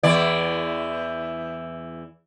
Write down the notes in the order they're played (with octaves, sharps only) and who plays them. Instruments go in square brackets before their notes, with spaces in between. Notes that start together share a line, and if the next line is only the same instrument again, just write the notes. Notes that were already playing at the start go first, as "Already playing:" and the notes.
[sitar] E2 E3 D5